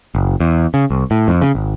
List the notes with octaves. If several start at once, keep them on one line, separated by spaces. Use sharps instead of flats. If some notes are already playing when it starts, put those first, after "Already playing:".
F#1
E2
C#3
C2
A2
F2
C#3
G#1